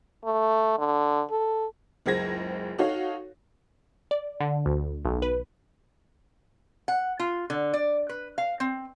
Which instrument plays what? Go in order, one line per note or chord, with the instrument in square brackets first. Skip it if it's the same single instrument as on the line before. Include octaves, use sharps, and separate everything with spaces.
[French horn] A3
D3
A4
[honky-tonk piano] F#1 C#2 G#3 C5 G#6 A#6
D#4 F#4 A4 C#5 F5
[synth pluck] D5
D3
D2
B1
B4
[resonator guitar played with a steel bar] F#5
F4
D3
D5
B4
F5
C4